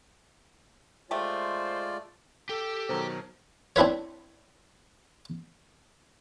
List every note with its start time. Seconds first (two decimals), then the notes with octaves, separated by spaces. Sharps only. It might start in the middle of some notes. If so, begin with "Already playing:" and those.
1.11 G#3 A3 F4 G4 A4 C5 D5
2.49 G4 A4 G5
2.89 B2 D#3 F#3 C5 A#5
3.76 C4 D4 E4 B4 C#5